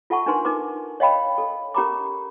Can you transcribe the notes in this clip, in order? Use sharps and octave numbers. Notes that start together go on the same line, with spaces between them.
F4 A4 E5 F#5 A5 C#6
D4 D#4 A#4 B4 G#5 C6
D#4 A#4 B4 D6
C#5 D#5 F5 G5 B5
A4
C#4 G4 A#4 A#5 B5 D6